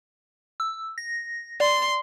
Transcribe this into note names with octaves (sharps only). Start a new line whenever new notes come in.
E6
A#6
D5 C6